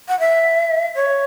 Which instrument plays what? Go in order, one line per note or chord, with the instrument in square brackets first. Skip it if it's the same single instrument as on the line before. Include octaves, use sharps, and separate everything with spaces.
[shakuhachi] F#5
E5
C#5